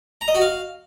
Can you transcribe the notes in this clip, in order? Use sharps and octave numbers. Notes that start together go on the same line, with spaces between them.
A#5
D#5
F#4
F5